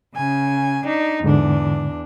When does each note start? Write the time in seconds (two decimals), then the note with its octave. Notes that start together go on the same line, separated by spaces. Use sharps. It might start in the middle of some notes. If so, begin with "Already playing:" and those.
0.15 C#3 G#5
0.86 D4 D#4
1.24 E2 G#2 D3 D4